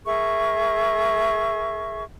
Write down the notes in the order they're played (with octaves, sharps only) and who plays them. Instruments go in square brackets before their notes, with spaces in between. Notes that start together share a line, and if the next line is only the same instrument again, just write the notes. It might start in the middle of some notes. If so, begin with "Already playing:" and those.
[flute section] G#4 A#4 E5 C#6